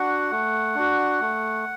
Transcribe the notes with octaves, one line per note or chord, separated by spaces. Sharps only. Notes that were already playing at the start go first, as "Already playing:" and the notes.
Already playing: D4 F#4 F#5
A3
D4 F#4
A3